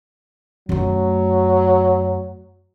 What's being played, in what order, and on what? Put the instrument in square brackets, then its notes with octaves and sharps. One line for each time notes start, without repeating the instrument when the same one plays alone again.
[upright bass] F#2 A3 [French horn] F#3